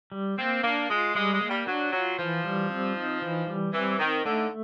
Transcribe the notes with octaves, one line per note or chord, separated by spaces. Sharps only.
G3
A#3 C4
A#3 D4
G#3 F4
G3 G#3
G#3
A#3
G3
F#3 D4
F#3 F4
E3 F3
G3
C4
D#4
E3
G3
E3 C4
D#3 D#4
D3 A3